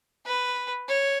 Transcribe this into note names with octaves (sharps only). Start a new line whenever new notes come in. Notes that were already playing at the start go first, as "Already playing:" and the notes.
B4
C#5